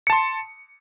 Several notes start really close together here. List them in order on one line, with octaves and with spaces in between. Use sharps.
C#7 A5 C6